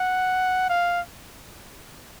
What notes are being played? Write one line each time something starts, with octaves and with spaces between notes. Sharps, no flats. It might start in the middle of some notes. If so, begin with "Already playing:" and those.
Already playing: F#5
F5